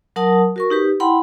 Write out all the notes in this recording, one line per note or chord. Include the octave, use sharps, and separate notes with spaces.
F#3 A#4 F#5 A5 D#6
F#4 A#4 C#6
D#4 G4 B4
E4 F#5 G5 B5 C6